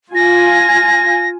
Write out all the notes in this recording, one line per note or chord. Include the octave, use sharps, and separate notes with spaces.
F4 G#5 A#6